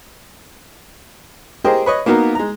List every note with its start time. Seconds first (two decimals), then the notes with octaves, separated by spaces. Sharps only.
1.65 G4 G#4 A#4 C5 D#5 G5
1.86 B4 C#5 D#5
2.06 A#3 B3 D#4 F#4 A#4
2.35 G#3 A#5